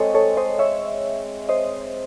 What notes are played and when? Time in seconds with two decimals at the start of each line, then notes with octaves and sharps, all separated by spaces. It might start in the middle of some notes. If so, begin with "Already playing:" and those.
Already playing: G#3 C4 A4 C5 C#5 D#5
0.15 A4 C#5
0.37 C5 D#5
0.59 C#5 E5
1.49 C5 D#5